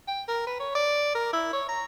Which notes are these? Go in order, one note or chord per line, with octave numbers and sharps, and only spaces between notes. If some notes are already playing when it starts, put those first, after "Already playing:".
G5
A#4
B4
C#5
D5
A#4
E4
C#5
A#5